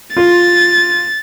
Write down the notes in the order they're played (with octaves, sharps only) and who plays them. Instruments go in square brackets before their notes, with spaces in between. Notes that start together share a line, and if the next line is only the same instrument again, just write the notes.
[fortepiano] F4 [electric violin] A6